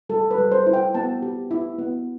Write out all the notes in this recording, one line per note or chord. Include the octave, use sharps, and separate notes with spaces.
G3 A4
B4
G3
C5
E4
G5
B3 A5
G4
E4
B3